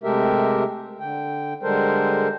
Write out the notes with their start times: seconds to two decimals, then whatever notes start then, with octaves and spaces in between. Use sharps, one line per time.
0.04 C3 G#3 A3 G4 A#4 E5
1.00 D3 G5
1.63 D3 G3 G#3 A4 A#4 C5